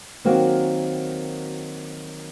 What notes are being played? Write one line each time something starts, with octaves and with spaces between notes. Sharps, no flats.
D#3 F#3 A#3 C4 F#4